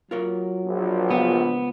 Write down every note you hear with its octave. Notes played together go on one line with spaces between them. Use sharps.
F#3 F4 A#4 C#5
A#1
C#2 B3 F4